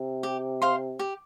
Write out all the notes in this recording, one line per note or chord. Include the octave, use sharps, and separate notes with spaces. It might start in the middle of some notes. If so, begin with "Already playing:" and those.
Already playing: C3
G4
C5 F5 C6
G4